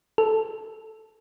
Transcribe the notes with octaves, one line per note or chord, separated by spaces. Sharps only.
A4